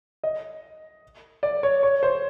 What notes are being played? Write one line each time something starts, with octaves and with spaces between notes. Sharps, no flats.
D#5
D5
C#5
C#5
C5